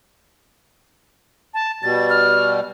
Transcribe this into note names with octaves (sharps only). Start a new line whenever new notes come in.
A5
B2 G3 A6
F6